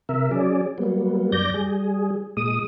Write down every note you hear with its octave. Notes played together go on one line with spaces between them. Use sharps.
C3 A#4 E5
F#3 C#4 G#4 D5
F#3 G3 A#3 B3
F#2 D5 G6 A#6
G3 G#4
A#2 G#3 D#6